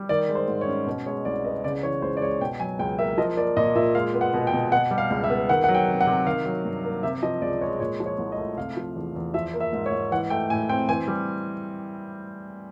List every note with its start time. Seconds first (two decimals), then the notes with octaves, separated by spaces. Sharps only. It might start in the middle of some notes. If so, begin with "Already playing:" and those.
Already playing: G3
0.09 D#3 D5
0.29 G#3
0.35 C5
0.48 G#2
0.61 C#5
0.67 C#4
0.87 B2
1.06 G#3 C#5
1.25 C2 D5
1.45 B3 D#5
1.64 C#3 D5
1.83 E3 C#5
2.02 C#2 C5
2.17 D5
2.21 G#3 C#5
2.41 B2 G5
2.60 F#3 G#5
2.79 C#2 G5
2.98 A#3 E5
3.18 F3 D#5
3.37 A#3 D5
3.57 A#2 D#5
3.75 A#2 E5
3.95 G#3 F5
4.14 B3
4.21 F#5
4.34 B2
4.47 G5
4.53 B2
4.72 B2 F#5
4.91 G3
4.98 F5
5.10 C#2
5.24 E5
5.30 B3
5.49 D#3 F#5
5.64 F#3 F#5
5.74 G5
5.88 C3
6.01 F#5
6.07 C3
6.27 D#3 F5
6.46 F#3
6.65 G2
6.84 A#3
7.03 C3 E5
7.23 F3 D#5
7.42 C#2 D5
7.61 G#3 C#5
7.80 A#2 C#5
8.00 F3
8.06 C#5
8.19 C2
8.32 D#5
8.38 A3
8.57 C3 F5
8.77 F3
8.96 E2
9.16 E2
9.34 F3 E5
9.54 A#3
9.60 E5
9.73 G#2
9.86 C#5
9.92 G#2
10.12 E3 F#5
10.30 A3 G5
10.50 A2 G#5
10.69 C4 G5
10.89 E3 G#5
11.08 G3